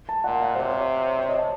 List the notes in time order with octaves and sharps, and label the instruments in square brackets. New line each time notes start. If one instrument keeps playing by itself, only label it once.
[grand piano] A5
[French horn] A#2 [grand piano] F#5
[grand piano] F5
[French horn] C3 [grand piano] C5
[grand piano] C#5
C#5
C#5
D#5
A5